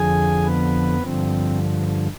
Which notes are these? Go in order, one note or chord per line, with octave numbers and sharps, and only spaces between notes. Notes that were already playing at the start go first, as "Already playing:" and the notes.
Already playing: F2 D3 F3 G#4 G#5
B3 B4
G2 D3 F3 C4